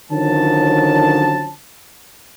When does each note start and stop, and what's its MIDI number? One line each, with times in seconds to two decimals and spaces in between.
0.11 1.52 50
0.11 1.52 51
0.11 1.52 53
0.11 1.52 54
0.11 1.52 61
0.11 1.52 81